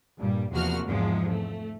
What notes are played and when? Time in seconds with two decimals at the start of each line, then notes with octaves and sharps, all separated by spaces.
0.18 G2 A#2 G3
0.51 E2 C3 F3 A#3 F#4 F6
0.85 G#1 E2 G#2 C3 F3 G#3
1.29 A3